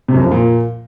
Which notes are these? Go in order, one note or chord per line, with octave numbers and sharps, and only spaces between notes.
C3
F#2
F2
F3
A#2